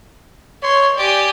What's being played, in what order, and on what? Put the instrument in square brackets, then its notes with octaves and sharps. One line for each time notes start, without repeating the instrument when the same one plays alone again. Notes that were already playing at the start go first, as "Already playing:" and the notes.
[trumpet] C#5 [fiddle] C6
[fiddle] G4 G#5 [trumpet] D5